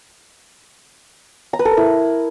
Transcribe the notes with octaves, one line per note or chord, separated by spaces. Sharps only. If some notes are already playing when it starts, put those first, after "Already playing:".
A#5
B4
A4
A#4
E4